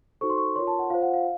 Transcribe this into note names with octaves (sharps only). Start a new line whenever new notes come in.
D#4 F#4 A4 C5 C#6
C6
C#6
F4 A#4 C#5 C6
A5
F#5
F4 C5 F5
F#5
F5